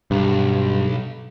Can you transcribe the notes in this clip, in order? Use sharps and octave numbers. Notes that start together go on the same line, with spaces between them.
B1 G2